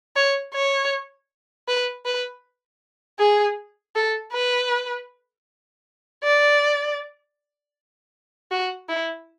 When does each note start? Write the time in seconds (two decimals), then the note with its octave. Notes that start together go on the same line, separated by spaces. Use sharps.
0.16 C#5
0.54 C#5
1.68 B4
2.06 B4
3.19 G#4
3.95 A4
4.33 B4
6.23 D5
8.51 F#4
8.89 E4